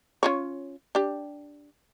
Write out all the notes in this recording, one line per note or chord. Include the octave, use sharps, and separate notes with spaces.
C#4 F4 C#5
D4 G4